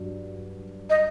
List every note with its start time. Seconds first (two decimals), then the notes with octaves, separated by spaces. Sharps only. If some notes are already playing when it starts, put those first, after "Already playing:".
Already playing: G2 F#3
0.90 D#5